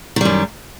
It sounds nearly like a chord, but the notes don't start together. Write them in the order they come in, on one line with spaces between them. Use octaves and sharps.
D#3 G3 F#2